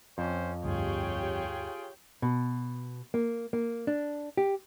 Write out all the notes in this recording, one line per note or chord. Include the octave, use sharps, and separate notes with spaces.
F2 C#4 C5
D2 G2 F4 G4 G#4 C#5 G5
B2
A#3
A#3
D4
G4